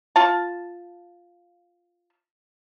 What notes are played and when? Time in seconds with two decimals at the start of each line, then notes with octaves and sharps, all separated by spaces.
0.16 F4 A5